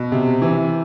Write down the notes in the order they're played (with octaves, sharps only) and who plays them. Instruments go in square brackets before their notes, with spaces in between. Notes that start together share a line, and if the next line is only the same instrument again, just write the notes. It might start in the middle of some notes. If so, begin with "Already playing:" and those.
Already playing: [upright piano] B2
C3
E3